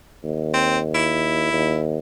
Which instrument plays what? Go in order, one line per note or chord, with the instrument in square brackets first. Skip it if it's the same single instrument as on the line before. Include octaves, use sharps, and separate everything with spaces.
[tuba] D#2
[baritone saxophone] C4
E4
[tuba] D#2